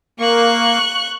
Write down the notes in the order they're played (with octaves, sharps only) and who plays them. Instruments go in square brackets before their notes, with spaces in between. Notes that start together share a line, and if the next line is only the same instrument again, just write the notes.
[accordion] A#3 [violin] C#6 F#6